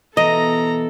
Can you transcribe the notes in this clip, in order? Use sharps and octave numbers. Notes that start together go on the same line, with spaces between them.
B2 E3 A4 D#5 A#5